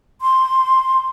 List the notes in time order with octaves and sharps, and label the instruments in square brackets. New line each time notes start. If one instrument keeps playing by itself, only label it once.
[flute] C6